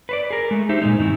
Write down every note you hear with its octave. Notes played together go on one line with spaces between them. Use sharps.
B4 C5 D5
G#4 A#4
G#3 A3
D#4 G4 C5 E5
A#2 G#3 D#4
G2 D#3 C4 E4